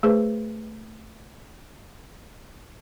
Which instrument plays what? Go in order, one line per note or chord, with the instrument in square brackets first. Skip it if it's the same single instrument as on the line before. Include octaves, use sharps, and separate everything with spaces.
[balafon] A3 G#4 B4 C5